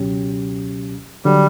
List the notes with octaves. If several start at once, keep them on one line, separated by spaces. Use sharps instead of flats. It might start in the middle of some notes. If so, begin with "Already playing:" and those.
Already playing: C#2 B2 F#3 C#4 G4
D3 F#3 G3